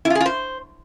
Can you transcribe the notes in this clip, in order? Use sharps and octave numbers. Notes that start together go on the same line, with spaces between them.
E4
F4
G#4
F4
C5